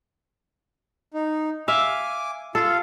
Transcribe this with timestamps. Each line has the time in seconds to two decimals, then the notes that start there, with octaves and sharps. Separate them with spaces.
1.14 D#4
1.68 E5 F5 G#5 D6
2.55 F4 A4 F5